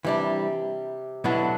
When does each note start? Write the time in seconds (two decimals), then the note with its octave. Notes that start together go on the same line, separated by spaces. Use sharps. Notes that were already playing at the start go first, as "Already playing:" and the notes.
0.04 C3 E3 G3 D4
1.24 B2 D3 F#3 B3 E4